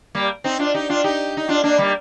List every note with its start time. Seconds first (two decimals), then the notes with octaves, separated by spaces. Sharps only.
0.15 G3 A#3
0.44 C4 D#4
0.59 D4 F4
0.74 D#4 G4
0.89 D4 F4
1.04 D#4 G4
1.37 D#4
1.49 D4 F4
1.63 A#3 D4
1.78 G3 A#3